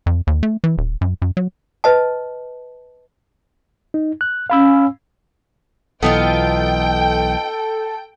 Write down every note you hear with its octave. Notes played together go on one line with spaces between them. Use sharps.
F2
D#2
A3
E3
D#1
F#2
F#2
F#3
B4 D#5 A5
D#4
F#6
C#4 F5 B5 E6
B1 E3 B3 D#4 F4 A4 G5